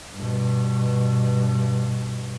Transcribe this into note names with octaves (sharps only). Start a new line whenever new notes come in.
G2 B2